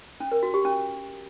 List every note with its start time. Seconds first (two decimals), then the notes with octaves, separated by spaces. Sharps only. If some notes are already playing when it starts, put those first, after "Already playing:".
0.20 C#4
0.32 A#4
0.43 F#4
0.54 G4
0.65 C#4